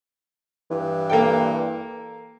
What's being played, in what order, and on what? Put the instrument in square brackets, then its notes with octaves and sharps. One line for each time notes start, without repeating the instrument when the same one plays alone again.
[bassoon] G2 [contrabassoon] E3
[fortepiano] A#3 A4 G5